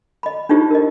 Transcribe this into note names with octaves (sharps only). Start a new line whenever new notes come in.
D#5 B5
D4 D#4 F4 G4 C5
A#4 D#5